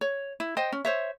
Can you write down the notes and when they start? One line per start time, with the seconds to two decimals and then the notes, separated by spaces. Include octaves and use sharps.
0.01 C#5
0.40 E4
0.57 C5 D#5 G5
0.72 C#4
0.85 C5 C#5 E5